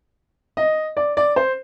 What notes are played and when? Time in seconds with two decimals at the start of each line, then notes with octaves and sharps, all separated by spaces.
0.57 D#5
0.97 D5
1.17 D5
1.36 C5